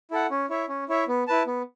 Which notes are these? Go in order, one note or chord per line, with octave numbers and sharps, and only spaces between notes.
E4 A4 F#5
C#4
E4 C#5 E5
C#4
E4 C#5 E5
B3
E4 B4 A5
B3